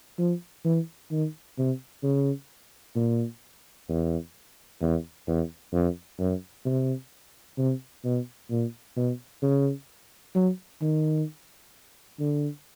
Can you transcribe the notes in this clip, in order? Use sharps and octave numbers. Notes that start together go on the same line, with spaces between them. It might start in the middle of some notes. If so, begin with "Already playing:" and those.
F3
E3
D#3
C3
C#3
A#2
E2
E2
E2
F2
F#2
C3
C3
B2
A#2
B2
C#3
F#3
D#3
D3